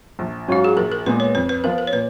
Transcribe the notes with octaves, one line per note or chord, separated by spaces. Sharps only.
A#1
G#2 F#3 C#4 F4 F#4
G#4
A#1 A#4
A#4
A#2 G#3 B3 B4
C#5
F2 B4
B4
F3 B3 F4 A#4
A#4
C#5
A#2 B4